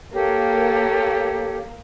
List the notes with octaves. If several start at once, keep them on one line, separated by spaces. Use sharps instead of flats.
A#3 G4 A4 C#5